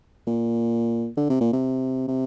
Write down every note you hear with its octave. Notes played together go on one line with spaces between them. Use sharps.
A#2
D3
C3
A#2
C3
C3